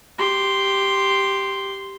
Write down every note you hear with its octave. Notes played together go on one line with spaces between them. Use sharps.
G4 C6